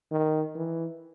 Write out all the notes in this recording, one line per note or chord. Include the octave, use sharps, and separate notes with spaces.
D#3
E3